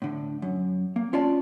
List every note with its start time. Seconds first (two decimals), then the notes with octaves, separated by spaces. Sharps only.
0.02 A2 D3
0.42 F#2
0.96 A#3
1.13 C#4 F4 D5 A5